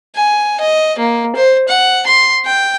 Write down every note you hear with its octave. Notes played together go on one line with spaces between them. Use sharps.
G#5
D#5
A#3
C5
F#5
C6
G5